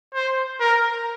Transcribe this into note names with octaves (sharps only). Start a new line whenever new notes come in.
C5
A#4